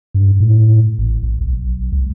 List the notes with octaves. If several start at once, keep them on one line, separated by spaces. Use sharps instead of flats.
G2
A2
A1
A#1
B1
C#2